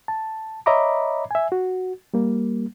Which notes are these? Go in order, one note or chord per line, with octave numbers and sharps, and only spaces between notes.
A5
C#5 D#5 E5 A#5 B5 D6
E5 G#5
F#4
G3 A#3